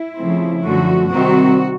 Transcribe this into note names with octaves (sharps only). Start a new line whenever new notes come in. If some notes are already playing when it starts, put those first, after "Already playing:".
Already playing: E4
C#3 F3 A3 C4
F#2 D3 F3 A3 F#4
C3 D#3 G3 C4 F#4